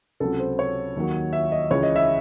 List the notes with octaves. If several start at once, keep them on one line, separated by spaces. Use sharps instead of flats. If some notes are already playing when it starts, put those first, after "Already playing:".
C#2 C3 F#3 A4
C5
C#5
D#2 D#3 F#3
E5
D#5
C#2 C#3 E3 C#5
D#5
E5